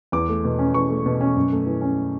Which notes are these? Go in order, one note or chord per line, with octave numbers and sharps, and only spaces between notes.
E2 D6
A3
B2
C#4
E2 C#6
A3
B2
C#4
F#2
A3
E3
C#4